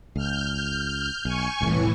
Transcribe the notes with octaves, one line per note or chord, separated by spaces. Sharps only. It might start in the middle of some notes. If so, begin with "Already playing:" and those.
C#2 F6 G6
B1 G#5 C#6
E1 C2 A2 E3